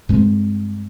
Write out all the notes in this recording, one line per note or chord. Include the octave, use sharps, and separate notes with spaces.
G2 G#3 C4